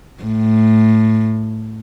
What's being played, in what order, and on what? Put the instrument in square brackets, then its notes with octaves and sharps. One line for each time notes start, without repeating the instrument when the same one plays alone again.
[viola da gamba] A2